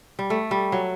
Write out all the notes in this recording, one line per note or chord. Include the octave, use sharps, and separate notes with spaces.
G3
A3
G3
F#3